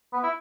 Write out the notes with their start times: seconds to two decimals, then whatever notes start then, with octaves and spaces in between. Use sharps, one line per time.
0.13 B3
0.23 E4